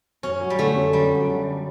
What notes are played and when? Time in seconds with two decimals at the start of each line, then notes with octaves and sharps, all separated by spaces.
0.23 F#2 C#4
0.41 F#3
0.50 G3
0.59 D3 A3
0.76 F#2
0.93 F#2 G3
1.11 F#3
1.28 D3